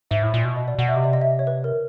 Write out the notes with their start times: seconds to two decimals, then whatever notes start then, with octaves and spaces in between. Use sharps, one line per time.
0.11 G#2 E5
0.23 A2
0.34 A#2
0.45 B2
0.56 D#5
0.68 D5
0.79 B2 F#5
0.88 E5
0.96 C3 D#5
1.04 D5
1.13 D#5
1.21 E5
1.39 C#5
1.47 B4
1.64 A#4